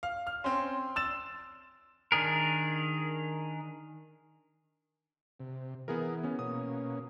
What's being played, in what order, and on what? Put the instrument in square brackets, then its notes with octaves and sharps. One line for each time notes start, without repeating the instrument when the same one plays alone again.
[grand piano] F5
F6
[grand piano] C4 C#4 [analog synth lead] C6
[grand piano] E6 A6 E7
[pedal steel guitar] D#3 D4 G#4 A#4
[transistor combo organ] C3
[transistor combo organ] E3 [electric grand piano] B3 G#4 A#4
[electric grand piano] B3 C#4
[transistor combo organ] B2 A#3 C#4 [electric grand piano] D#6